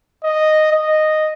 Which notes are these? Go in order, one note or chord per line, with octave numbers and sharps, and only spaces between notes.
D#5
D#5